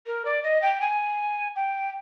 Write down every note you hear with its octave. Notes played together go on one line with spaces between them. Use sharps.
A#4
D5
D#5
G5
G#5
G5